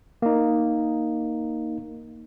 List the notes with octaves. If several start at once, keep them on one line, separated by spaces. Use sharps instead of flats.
A#3 D#4